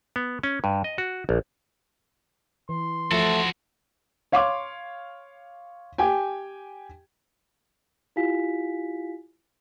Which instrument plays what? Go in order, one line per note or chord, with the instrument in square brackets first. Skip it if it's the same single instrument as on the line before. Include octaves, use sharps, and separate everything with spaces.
[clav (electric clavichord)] B3
C#4
G2
D#5
F#4
A#1
[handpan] E3 [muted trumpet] C6
[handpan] F3 [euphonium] A3 [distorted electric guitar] F#4 A4
[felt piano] C#5 F5 C6 D6
G4 G5 G#5
[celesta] E4 F4 G4 F5 G#5 B6